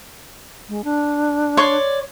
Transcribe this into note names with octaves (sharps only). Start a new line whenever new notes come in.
G#3
D4
C#5 D5 C6